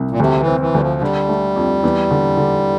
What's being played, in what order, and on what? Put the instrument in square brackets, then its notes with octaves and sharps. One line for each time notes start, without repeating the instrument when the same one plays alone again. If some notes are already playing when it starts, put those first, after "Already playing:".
Already playing: [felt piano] C2
[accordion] A#2
[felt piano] D2 [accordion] C3
[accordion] E3
[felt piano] C4
[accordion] E3
[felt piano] D2 [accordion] G3
[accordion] F3
[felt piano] D3 [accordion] G3
[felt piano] A3
F2
E2
D3
D3